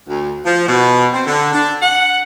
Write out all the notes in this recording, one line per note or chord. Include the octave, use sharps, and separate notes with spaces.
D2
F3
B2
C4
D3
D4
F#5